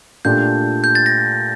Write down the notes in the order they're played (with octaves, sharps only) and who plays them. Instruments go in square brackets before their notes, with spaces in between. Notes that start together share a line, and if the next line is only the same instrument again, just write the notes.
[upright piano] A#2 A3 D4 G4 [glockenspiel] G6
[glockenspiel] G6
A6
A#6